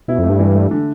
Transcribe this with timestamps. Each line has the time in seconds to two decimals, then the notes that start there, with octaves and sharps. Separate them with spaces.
0.08 B2 E4
0.19 F2 A3
0.29 G2
0.39 E3
0.55 A3
0.71 D3